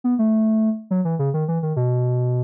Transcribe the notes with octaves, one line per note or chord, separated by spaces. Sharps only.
B3
A3
F#3
E3
C#3
D#3
E3
D#3
B2